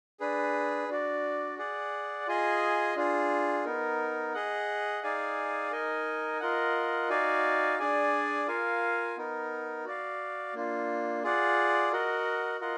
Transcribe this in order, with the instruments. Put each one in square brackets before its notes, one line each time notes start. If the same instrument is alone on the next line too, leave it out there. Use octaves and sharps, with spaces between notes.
[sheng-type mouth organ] D4 G#4 B4
D4 F#4 D5
G#4 D5 F#5
F4 G#4 D#5 G#5
D4 F4 G#4
B3 D#4 A#4
G#4 D#5 F#5
D#4 G#4 D5 F5 G#5
D#4 A#4 D#5 G#5
F4 A#4 D#5 F#5
D#4 F#4 D5 F5 G#5
D4 G#4 D5 G#5
F4 A#4 F5 G#5
B3 D#4 A#4
F#4 D5 F5
A#3 D4 F4
F4 G#4 D5 F#5
F#4 A#4 D#5 F#5
F4 A#4 D#5 F#5